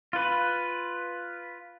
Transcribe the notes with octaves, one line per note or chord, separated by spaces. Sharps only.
F4 B4